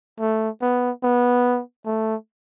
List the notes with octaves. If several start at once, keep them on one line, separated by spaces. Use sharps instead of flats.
A3
B3
B3
A3